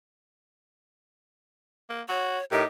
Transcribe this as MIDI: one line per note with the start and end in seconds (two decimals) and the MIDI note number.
1.90 2.02 58
2.09 2.39 66
2.09 2.45 73
2.52 2.63 45
2.52 2.63 63
2.52 2.63 67
2.52 2.63 70
2.52 2.63 76